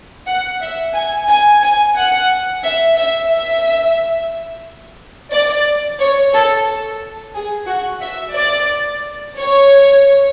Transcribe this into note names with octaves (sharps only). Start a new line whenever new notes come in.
F#5
E5
G#5
G#5
G#5
F#5
E5
E5
E5
D5
C#5
A4
G#4
F#4
E5
D5
C#5